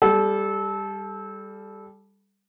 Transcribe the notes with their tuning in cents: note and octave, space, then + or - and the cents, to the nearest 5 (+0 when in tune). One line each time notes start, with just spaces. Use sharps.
G3 +15 A4 -20